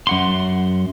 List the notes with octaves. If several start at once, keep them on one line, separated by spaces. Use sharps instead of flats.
F#2 F#5 C6